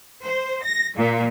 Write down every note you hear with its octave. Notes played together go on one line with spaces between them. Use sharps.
C5
A#6
A#2